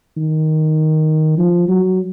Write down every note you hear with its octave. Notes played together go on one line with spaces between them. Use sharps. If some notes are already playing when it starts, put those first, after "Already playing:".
D#3
F3
F#3